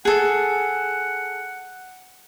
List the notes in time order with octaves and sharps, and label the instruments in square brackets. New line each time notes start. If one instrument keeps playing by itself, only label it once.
[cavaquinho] G#4 A4 [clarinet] F#5